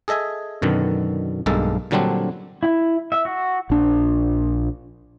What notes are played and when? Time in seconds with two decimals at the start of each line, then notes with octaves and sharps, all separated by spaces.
0.08 G#4 A4 D#5 E5 G#5
0.62 F#2 B2 D3 D#3
1.46 B1 G2 G#3 A#3 A4 A5
1.91 A#2 D3 F#3 G3 C4 D4
2.63 E4
3.12 E5
3.25 F#4
3.70 A#1 D4